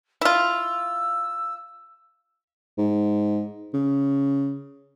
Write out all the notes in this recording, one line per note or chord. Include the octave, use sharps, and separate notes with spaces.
E4 F4 E6
G#2
C#3